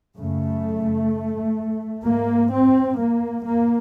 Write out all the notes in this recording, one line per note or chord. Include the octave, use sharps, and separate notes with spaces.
F#2 C#3 A3
G#2 A#3
C4
A#3
A#3